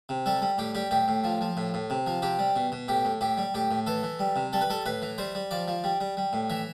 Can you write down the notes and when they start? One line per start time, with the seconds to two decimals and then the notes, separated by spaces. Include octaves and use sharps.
0.09 C3
0.26 G3 A4
0.42 G3
0.58 A2 G4
0.75 G3 G4
0.91 A2 G4
1.08 A2
1.24 F3
1.41 F3
1.57 A2
1.74 A2
1.90 C3
2.07 F3
2.22 C3 G4
2.39 G3
2.56 B2
2.72 B2
2.88 A2 G4
3.05 A2
3.21 A2 G4
3.37 G3
3.54 A2 G4
3.71 A2
3.87 E3 A4
4.03 E3
4.19 G3
4.36 C3
4.53 G3 A4
4.61 B4
4.70 G3 A4
4.86 A2 B4
5.02 E3
5.18 G3 C5
5.35 G3
5.51 F3 D5
5.68 F3
5.84 G3
6.01 G3
6.17 G3
6.33 A2
6.50 E3 E5